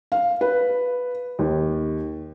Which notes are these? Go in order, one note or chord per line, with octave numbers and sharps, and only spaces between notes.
F5
B4
D#2